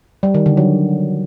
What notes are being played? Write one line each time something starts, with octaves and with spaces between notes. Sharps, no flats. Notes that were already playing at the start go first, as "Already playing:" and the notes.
G3
D#3
D3
F#3